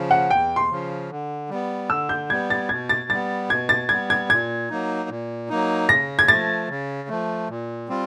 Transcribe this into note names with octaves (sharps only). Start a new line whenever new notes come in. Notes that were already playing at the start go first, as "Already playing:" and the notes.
Already playing: C#3 F3
F#5
E2 G5
C6
C#3 F3
D3
G3 B3
D3 E6
G6
G3 B3 G#6
A6
B2 G#6
A6
G3 B3 A6
B2 G#6
A6
G3 B3 G#6
G#6
A#2 G#6
F#3 A#3 D#4
A#2
F#3 A#3 D#4
C#3 A#6
G#6
F3 A3 A6
C#3
F3 A3
A#2
G3 C4 F4